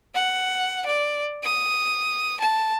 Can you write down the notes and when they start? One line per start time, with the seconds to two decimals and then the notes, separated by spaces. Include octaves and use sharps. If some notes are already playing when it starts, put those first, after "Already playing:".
0.14 F#5
0.86 D5
1.44 D#6
2.40 A5